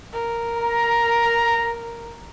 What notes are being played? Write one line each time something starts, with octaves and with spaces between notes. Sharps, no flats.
A#4
A#5